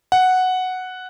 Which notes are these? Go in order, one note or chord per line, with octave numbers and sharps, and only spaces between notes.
F#5